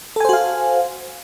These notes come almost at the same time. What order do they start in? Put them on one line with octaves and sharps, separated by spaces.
A4 G#5 C5 F#4 F5